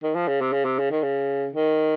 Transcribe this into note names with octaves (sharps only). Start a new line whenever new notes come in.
D#3
F3
C#3
C3
C#3
C3
C#3
D#3
C#3
D#3